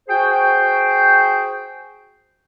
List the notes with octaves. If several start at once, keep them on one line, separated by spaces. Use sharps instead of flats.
F#4 G#4 C5 G5